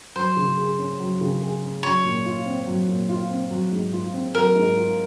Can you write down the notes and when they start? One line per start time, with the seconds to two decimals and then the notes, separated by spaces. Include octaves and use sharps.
0.16 F#3 C5
0.37 C#3
0.57 G#4
0.79 C#4
1.00 F#3
1.21 C#3
1.41 G#4
1.62 C#4
1.83 F#3 C#5
2.04 A#2
2.26 F4
2.46 C4
2.67 F#3
2.88 A#2
3.09 F4
3.30 C4
3.51 F#3
3.72 G#2
3.93 F4
4.13 C4
4.35 F#3 A#4
4.55 G#2
4.77 F4